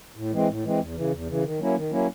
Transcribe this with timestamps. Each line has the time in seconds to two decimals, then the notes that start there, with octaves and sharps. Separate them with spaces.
0.16 A2
0.32 E3 G#3 C4
0.48 A2
0.64 E3 G#3 C4
0.80 E2
0.96 C#3 E3
1.12 E2
1.28 C#3 E3
1.44 D#3
1.59 F#3 A#3 C#4 E4
1.75 D#3
1.91 F#3 A#3 C#4 E4